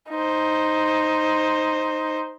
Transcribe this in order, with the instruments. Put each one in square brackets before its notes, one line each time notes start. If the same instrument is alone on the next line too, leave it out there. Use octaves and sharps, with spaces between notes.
[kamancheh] D#4 C5